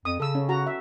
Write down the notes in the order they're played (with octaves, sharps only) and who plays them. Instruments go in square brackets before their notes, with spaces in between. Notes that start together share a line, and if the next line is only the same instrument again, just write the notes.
[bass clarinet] F2 [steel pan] D#6
[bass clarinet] C#3 [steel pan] A4 E6
[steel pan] C#4
F#4 A#5
E5